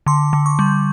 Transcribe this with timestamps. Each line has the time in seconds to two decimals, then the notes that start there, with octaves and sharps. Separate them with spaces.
0.06 D3 C6
0.33 D3
0.46 C#6
0.59 G3